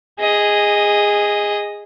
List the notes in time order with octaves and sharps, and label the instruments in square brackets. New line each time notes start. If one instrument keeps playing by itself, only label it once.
[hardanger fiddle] G#4 D#5